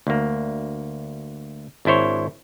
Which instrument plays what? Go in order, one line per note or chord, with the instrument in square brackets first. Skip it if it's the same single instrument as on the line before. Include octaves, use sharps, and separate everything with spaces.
[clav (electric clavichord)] D2 A#3
G#1 D4 E4 C5 C#5